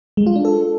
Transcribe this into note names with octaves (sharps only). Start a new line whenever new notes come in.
G#3
F4
D4
A4